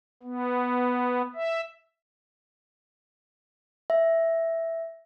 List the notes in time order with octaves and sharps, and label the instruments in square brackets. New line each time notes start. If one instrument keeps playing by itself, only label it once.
[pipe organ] B3
E5
[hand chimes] E5